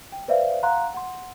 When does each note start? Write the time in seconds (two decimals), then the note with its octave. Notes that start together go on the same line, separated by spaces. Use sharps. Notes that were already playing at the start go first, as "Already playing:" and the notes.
0.12 G5
0.28 B4 C5 D5 E5 F5
0.63 F5 F#5 A#5 C6 F#6
0.94 F#5 C6